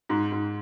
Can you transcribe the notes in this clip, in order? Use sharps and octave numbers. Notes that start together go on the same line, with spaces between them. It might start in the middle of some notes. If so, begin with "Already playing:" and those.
G#2
G#2